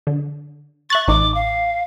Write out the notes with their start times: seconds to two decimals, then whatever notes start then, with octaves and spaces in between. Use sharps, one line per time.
0.07 D3
0.90 E5 C#6 F#6 A6
1.08 A1 D#4 D6
1.35 F5